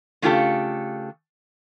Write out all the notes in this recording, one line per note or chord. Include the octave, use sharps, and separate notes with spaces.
C#3 A3 D4 F4 G4 A4